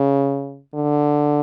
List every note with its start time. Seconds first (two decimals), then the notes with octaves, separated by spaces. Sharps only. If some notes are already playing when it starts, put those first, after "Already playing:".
Already playing: C#3
0.75 D3